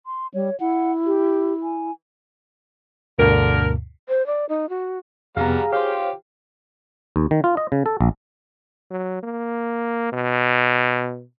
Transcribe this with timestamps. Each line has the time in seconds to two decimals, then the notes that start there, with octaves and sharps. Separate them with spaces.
0.06 C6
0.34 G3 C#5
0.60 E4 F#5
1.06 G4
1.63 G#5
3.19 D2 G2 B2 D3 A#4
4.09 C5
4.26 D5
4.49 D#4
4.69 F#4
5.37 F2 C3 G3 B3 G#4 F5 F#5 A#5
5.73 F4 G4 C5 C#5 F5 G5
7.16 D#2
7.31 D#3
7.44 F4
7.57 D#5
7.72 C#3
7.86 A4
8.01 A#1
8.91 F#3
9.23 A#3
10.13 B2